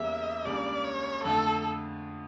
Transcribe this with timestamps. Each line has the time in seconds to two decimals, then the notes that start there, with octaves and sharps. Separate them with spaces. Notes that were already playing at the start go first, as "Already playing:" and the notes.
Already playing: E2 C#3 G3 A#3 E5
0.45 C#2 C#3 G3 A#3 D4 D5
0.85 C#5
1.24 F2 D3 A3 A4